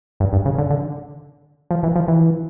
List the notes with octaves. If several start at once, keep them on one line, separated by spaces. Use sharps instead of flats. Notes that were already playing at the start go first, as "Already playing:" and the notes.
G2
G2
C#3
D3
D3
F3
E3
F3
E3